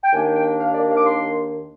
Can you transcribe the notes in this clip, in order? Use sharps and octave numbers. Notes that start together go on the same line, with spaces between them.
G5
D#2 D#3 A#3 D4 G#5
G5
F5
D5
F5
D6
C6